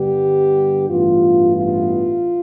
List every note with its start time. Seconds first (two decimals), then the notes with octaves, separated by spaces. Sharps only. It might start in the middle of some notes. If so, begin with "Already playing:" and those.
Already playing: G2 D3 G3 B3 G4
0.90 A1 G2 E3 B3 F4
1.57 F4